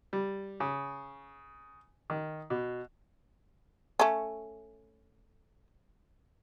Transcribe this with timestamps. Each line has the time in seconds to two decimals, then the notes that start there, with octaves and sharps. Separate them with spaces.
0.13 G3
0.60 C#3
2.10 D#3
2.50 B2
4.00 A3 C#4